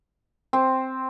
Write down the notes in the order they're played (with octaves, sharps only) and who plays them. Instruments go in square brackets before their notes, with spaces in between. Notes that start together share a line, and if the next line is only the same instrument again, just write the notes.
[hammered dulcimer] C4